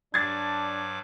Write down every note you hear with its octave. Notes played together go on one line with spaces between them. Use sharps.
G2 F#3 D4 D6 G#6 A6